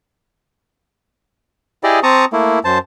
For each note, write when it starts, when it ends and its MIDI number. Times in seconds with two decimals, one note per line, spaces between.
1.84 2.00 64
1.84 2.00 67
1.84 2.00 68
1.84 2.00 74
1.84 2.00 75
2.03 2.25 60
2.03 2.25 81
2.03 2.25 82
2.03 2.25 85
2.03 2.25 87
2.33 2.59 57
2.33 2.59 58
2.33 2.59 64
2.65 2.78 42
2.65 2.78 72
2.65 2.78 81